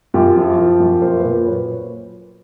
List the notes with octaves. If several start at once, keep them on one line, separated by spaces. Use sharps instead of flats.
F#2 F4 G4
F3
F3
F#2
A#2 A#4 C5
B4
A#2 A#4 C5
F#3 B4 C#5